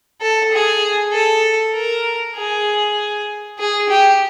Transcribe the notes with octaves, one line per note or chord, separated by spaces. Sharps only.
A4
G#4
A4
A#4
G#4
G#4
G4